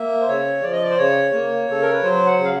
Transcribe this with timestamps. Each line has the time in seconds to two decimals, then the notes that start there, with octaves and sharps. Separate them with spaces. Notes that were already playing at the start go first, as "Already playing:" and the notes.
Already playing: A#3 E5
0.21 C5
0.28 C#3 C#5
0.63 F3 D5
0.73 D#5
0.82 D5
0.90 C5
0.98 C#3 C#5
1.33 A#3
1.68 C#3 A4
1.82 A#4
1.92 B4
2.03 F#3 C5
2.26 F#5
2.38 C#3
2.44 F5